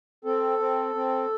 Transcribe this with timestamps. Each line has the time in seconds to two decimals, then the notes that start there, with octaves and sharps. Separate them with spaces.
0.25 C4 A4
0.59 C4
0.94 C4